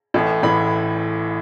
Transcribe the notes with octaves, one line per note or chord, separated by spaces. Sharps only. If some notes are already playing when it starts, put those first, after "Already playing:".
A1 A2 E3
A1 A2 E3 B5